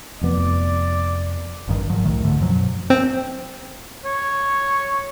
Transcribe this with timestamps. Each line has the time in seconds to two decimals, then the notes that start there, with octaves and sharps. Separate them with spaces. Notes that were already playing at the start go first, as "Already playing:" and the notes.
0.21 F1 F2 B3 D5
1.68 G#1 G2 D#3
1.90 G#2 D#3 F3 F#3
2.04 C2 A2 D#3 A3
2.24 C#2 G#2 D3 A3
2.41 F#2 B2 F3 F#3
2.90 C4
4.05 C#5